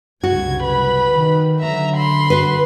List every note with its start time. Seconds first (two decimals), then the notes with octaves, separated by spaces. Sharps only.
0.24 F#1 C2 F#4 G#6
0.61 B4 B5
1.09 D#3
1.60 D3 F#3 E5 A#5
1.96 B5 C6
2.30 F#4 B4